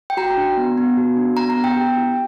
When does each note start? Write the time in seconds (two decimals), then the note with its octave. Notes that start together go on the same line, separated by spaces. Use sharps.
0.10 G5
0.17 F#4 A#5
0.37 D4
0.57 B3
0.78 B3
0.97 F#4
1.17 D4
1.37 B3 A#5
1.50 A#5
1.57 B3
1.64 G5
1.76 G4
1.97 E4